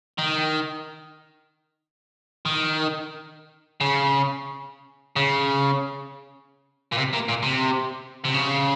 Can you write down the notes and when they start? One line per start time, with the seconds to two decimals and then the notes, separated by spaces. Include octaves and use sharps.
0.19 D#3
2.46 D#3
3.81 C#3
5.16 C#3
6.93 A#2
6.98 C3
7.14 A#2
7.29 A#2
7.43 C3
8.25 C3
8.34 C#3